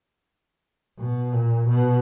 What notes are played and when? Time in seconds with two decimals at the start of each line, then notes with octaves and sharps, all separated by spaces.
0.99 B2
1.33 A#2
1.69 B2